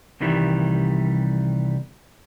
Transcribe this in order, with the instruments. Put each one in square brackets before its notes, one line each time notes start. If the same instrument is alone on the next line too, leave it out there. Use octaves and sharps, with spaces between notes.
[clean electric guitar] C2 C3 D#3 E3 G3